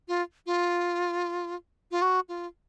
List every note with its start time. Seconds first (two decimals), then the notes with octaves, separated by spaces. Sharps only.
0.08 F4
0.46 F4
1.91 F4
2.02 F#4
2.29 F4